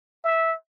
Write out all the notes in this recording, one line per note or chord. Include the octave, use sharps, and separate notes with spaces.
E5